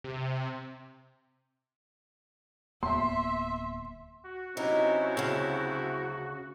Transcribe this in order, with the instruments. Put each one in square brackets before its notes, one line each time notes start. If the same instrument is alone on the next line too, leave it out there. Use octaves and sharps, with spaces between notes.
[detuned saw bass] C3
[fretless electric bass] D1 A#3 B3 [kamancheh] E5 [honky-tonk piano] C6
[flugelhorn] F#4
[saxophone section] C3 F#3 E4 [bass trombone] C#4 [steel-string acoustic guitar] D#4
[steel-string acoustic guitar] D2 C#3